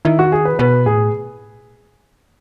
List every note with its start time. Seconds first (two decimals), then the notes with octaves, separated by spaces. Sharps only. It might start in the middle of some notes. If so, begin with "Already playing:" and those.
0.05 D#3 E4
0.19 F#4
0.32 G#4
0.45 B4
0.59 B2 B4
0.86 A2 G#4